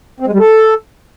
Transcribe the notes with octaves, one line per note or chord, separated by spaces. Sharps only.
C4
G#3
G3
A4